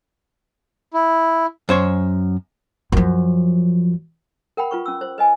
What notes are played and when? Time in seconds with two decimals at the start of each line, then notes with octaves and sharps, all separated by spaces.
0.94 E4
1.69 F#2 C5 C#5
2.92 F#2 F3
4.57 A#4 F#5 G5 B5
4.71 F4 B4 C#6
4.86 C#4 E6
5.01 C5
5.18 B4 D#5 G#5